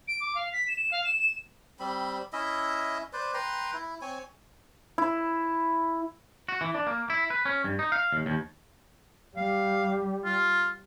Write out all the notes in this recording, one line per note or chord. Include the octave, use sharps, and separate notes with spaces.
D7
D6
F5
B6
E7
E7
F5
E7
E7
G3 C4 B5
C#4 E4 D#5 E5
B4 C5 D5
B4 G5 A#5 C6
E4
C4 C#5 G#5
E4
F#4
E3
D4
A#3
E4
B4
C#4
G2
D#4
F5
D#2
D#2
G3 F5
F4